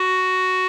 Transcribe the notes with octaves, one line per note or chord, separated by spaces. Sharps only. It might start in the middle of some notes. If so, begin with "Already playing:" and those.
Already playing: F#4